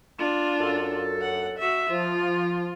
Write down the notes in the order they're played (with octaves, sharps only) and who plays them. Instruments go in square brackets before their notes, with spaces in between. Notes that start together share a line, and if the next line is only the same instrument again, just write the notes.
[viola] D4 F4
[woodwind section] F#2 A4
[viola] F#5
F#4 E5
[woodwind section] F3 [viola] F4